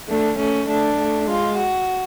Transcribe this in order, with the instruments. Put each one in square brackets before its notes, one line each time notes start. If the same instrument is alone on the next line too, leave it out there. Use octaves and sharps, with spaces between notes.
[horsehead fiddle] A3 [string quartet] D4
[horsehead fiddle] A3 [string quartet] C#4
[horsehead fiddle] A3 [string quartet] D4
[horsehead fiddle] A3
[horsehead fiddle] G#3 [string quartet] F4
[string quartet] F#4